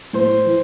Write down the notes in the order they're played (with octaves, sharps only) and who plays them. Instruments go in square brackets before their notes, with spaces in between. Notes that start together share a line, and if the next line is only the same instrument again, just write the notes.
[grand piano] A2 C5
E3